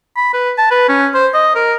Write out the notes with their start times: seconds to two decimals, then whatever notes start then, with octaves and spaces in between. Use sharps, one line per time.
0.16 B5
0.34 B4
0.58 A5
0.71 B4
0.89 C#4
1.15 C5
1.34 D#5
1.55 A#4